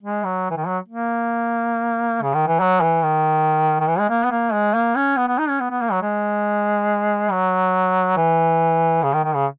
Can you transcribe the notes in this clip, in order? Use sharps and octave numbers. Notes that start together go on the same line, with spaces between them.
G#3
F#3
E3
D#3
F#3
A#3
C#3
D#3
E3
F#3
E3
D#3
D#3
E3
G#3
A#3
B3
A#3
G#3
A#3
C#4
B3
B3
D#4
C#4
B3
B3
A#3
F#3
G#3
F#3
E3
C#3
D#3
D#3
C#3